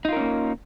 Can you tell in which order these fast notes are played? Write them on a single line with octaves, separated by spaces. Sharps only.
D#4 F4 A#4 C#4 A#3